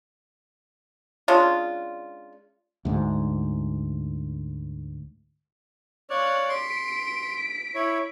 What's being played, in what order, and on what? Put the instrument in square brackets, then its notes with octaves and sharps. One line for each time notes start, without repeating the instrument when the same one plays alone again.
[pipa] G#3 C#4 D4 F4
[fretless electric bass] D2 G#2
[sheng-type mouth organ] C#5 D5 [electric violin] F5 F#6
[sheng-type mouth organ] C6 [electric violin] B6 D7
[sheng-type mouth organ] E4 C#5